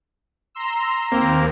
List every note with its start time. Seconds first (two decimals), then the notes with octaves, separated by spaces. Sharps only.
0.55 A#5 C6 E6
1.12 D#2 A#3 C4